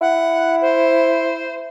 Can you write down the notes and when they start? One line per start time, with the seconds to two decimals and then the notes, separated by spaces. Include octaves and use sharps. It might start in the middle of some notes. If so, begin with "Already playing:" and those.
0.01 E4 F#5
0.61 C5